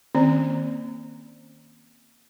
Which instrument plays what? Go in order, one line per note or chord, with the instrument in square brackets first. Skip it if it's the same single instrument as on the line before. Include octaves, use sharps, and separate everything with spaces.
[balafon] D#3 A#3 C4 C#4 D5